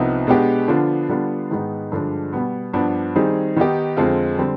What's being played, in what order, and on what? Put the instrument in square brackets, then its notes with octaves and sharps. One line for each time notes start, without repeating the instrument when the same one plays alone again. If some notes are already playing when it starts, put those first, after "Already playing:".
Already playing: [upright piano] C2 C3 F3 B3 D#4
B2 G#3 B3 D4 G4
D3 F3 B3 D4 F4
D3 G3 B3 D4 F4
G#2 D#3 G#3 B3 D#4
G2 D3 F3 G#3 D4
B2 G3 B3
G2 F3 B3 D4
D#3 G3 C4 D#4 G#4
D#3 B3 D#4 G4
F2 D3 G#3 C4 F4
D3 G3 C4